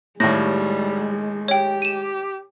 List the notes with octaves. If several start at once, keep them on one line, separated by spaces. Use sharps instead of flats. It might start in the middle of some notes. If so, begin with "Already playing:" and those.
D#2 A2 G3 G#3 A#6
G4 C#5 G5
D#7 E7